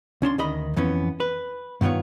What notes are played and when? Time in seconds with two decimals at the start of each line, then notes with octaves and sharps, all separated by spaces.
0.22 C#2 C#4 D4 C6
0.38 D2 D#3 D#5 B5
0.76 F2 E3 B3 C#4
1.20 B4
1.81 G2 D#3 B3 F4 C#5